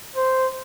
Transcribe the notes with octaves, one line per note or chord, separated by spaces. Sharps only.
C5